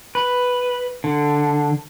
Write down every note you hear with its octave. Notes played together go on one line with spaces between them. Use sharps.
B4
D3